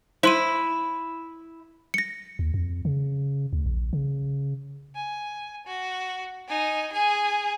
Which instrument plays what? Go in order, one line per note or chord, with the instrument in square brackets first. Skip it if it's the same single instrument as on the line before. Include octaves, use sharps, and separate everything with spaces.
[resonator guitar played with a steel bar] E4 [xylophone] C5 C6 D#7
[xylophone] A#6 C#7
[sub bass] D#2
F2
C#3
D2
A#1
C#3
[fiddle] G#5
F#4
D#4 G#5
G#4 G#5